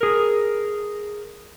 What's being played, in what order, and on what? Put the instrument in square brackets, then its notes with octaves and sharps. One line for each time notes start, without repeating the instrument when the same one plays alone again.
[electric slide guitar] G#4 A#4